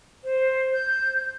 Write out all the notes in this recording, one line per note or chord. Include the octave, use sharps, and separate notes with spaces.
C5
G6